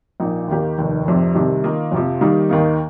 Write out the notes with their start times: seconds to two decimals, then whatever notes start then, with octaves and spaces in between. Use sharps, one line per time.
0.20 A#1 A#2 A#3 D#4
0.48 D#2 D#3 A#3 G4
0.78 F1 D#2 D#3
1.05 F1 F2 C3
1.35 C2 C3 D#3 G3
1.63 D#3 A#3 F4 D#5
1.92 F2 C3 F3
2.21 D#3 G3 A#3 D#4
2.49 D#2 D#3 A#3 D#4